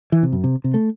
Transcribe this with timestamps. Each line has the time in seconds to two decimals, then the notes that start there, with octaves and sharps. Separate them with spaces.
0.12 E3
0.23 C3
0.32 F#2
0.44 C3
0.64 C3
0.74 A3